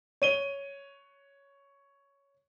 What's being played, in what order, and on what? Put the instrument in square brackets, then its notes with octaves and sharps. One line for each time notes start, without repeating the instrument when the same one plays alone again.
[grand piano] C#5 D#7 G7